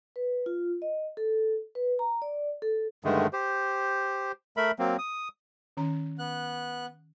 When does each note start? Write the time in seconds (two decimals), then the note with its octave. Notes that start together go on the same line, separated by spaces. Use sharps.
0.16 B4
0.46 F4
0.82 D#5
1.17 A4
1.75 B4
1.99 A#5
2.22 D5
2.62 A4
3.05 G2 D3 D#3 G#3 A3
3.33 G4 C5
4.57 A3 A#4 E5 B5
4.79 F#3 A#3 C4
4.98 D#6
5.77 D#3 C#4 A#5
6.19 B3 F#6